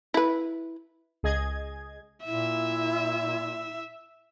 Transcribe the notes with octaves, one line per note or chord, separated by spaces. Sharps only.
E4 B4
C#2 G#4 D#5 G#6
A#2 E4 E5